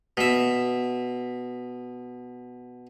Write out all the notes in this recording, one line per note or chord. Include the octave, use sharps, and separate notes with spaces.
B2 E5